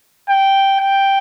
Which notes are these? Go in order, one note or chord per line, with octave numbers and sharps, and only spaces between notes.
G5
G5